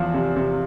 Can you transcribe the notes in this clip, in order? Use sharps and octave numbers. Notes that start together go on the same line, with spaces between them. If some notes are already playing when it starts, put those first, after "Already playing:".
Already playing: E2 F3
C3
C3